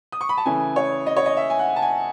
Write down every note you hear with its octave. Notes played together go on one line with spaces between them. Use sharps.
D#6
C#6
B5
A5
C#3 E3 A3 C#4 G#5
C#5
D#5
C#5
D#5
E5
G#5
F#5
A5
G#5